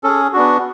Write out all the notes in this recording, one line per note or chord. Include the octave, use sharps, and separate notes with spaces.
C#4 G#4 A4
B3 D4 F#4